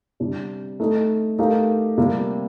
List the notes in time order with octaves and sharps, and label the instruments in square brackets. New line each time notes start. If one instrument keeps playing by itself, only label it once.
[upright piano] C3 G3 D4
A3 D#4 A4 D#5
A3 D#4 G4 A#4 F5
C3 G3 A#3 F4 A#4